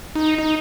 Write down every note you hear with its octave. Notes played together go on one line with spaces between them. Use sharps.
D#4
D#4